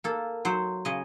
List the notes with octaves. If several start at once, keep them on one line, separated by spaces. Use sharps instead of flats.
A#3 A4
F#3 C5
C#3 D#5